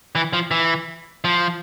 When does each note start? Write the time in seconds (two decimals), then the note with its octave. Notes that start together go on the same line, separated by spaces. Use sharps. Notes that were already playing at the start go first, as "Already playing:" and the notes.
0.15 E3
0.33 F3
0.51 E3
1.24 F3